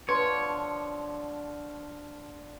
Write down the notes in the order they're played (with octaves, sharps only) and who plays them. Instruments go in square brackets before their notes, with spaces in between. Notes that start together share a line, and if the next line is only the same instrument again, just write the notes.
[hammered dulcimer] D3 F3 D4 [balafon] B4 C6 [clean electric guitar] C#5